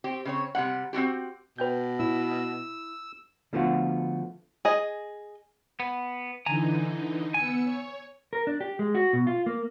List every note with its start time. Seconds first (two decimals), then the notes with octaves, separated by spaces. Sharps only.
0.04 C4 G4
0.25 C#3 C4 C#5
0.55 C3 G3 A#3 F#5
0.93 C4 C#4 F#4 G4
1.58 B2 B4 G5 G6
1.99 E4 E6
3.53 D3 F3 A3 B3 F4 F#4
4.65 G#4 D#5
5.80 B3
6.46 D3 E3 D#4 G#5 A#5
7.34 B3 G#5 E6 C#7
7.65 C#5
8.33 A#4
8.47 D4
8.61 G4
8.79 G#3
8.95 F#4
9.13 B2
9.27 F4
9.46 A#3